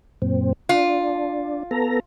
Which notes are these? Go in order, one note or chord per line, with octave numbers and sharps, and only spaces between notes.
F#2 A#2 C4
D4 F4
B3 A4 A#5